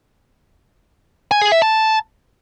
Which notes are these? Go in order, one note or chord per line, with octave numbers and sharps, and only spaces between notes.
G#5
G#4
E5
A5